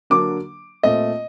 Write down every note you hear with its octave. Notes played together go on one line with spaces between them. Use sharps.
D3 F#3 A#3 D4 D6
A#2 A3 C4 D#5